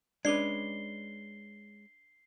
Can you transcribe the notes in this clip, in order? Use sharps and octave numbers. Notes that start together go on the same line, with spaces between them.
G#3 C#4 D4 B4 D5 D6 C7 G7